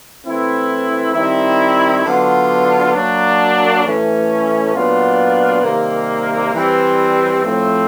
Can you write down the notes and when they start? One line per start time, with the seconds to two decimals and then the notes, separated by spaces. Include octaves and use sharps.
0.25 E3 A3 C4 E4
1.15 D#3 G3 C4 E4
2.04 D3 F#3 B3 D4 F4
2.94 F#3 A#3 D4
3.84 A2 E3 A3 C#4
4.74 A#2 F#3 B3 D4 F4
5.63 C3 D#3 G3 A#3
6.54 E3 G3 C4
7.42 A2 F3 A3 C4